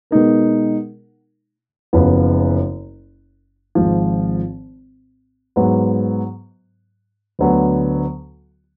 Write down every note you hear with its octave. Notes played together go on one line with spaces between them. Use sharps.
B2 G#3 D#4 A#4
F#1 F#2 F3 B3
G#1 G#2 F3
G#2 F#3 B3
D2 D3 F#3 B3